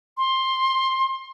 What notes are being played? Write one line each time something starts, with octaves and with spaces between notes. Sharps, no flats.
C6